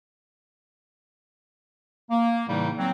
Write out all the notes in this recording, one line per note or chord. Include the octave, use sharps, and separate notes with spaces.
A#3
A2 C#3 E3 G3 D#4
F#3 C4